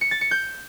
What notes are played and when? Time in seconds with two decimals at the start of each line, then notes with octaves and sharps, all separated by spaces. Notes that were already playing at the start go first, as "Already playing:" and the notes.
0.01 C#7
0.11 A6
0.21 C#7
0.31 G6